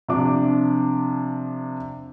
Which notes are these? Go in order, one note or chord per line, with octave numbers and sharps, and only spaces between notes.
C3 F3 D4 D6